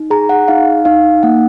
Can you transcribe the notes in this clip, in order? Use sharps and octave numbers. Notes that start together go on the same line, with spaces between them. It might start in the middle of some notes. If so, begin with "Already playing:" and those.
Already playing: D#4
G#4 A#5
F#5
D#4 F5
D#4 F5
A#3 F#5